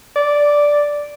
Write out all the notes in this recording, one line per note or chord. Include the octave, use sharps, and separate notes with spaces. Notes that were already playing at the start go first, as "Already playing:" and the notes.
D5